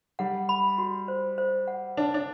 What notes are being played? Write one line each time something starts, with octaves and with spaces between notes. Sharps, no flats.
G3 F#5
B5
F#4
C5
C5
F#5
D4 B4
D4